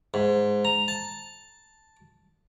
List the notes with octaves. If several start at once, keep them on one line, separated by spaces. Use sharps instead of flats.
G#2
A#5
A5